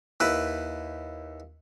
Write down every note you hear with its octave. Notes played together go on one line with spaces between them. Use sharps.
D#2 E4 B4